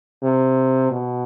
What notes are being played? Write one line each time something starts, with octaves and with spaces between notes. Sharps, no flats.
C3
B2